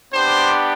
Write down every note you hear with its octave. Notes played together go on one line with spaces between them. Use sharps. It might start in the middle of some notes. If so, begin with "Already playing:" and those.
B3 D4 G4 C5